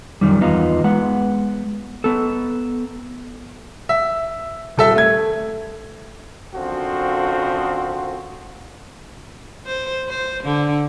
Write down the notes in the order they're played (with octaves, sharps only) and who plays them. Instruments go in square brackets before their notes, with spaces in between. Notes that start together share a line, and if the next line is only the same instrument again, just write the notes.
[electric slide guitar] F#2 C3 D#3 G3
E2 B3 D#4 F4
G#3 B3 F#5
B3 A4
[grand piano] E5
D#1 A4 E5
A3 G#6
[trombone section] F#2 D3 F3 C4 F#4
[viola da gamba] C5
C5
D3